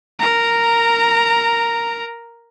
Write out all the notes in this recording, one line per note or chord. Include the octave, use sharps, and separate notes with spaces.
A#4 A#5